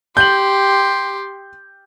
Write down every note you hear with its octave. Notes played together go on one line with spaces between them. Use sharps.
G4 C6 G6 F#7